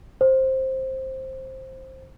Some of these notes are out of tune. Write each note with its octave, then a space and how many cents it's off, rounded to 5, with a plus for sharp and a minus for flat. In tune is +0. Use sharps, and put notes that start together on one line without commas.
C5 +10